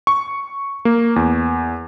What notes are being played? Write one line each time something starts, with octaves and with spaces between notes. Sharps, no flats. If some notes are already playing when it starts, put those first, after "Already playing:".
C#6
A#3
E2